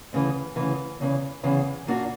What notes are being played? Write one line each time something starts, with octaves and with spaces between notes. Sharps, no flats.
D2 C#3 E3
D2 C#3 E3
E2 C#3 E3
E2 C#3 E3
A#2 A#3 D4 F#4